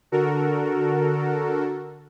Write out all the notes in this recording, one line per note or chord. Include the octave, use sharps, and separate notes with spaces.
D3 F#4 A4 A#4